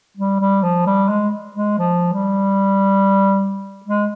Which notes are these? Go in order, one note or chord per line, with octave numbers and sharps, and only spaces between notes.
G3
G3
F3
G3
G#3
G#3
F3
G3
G#3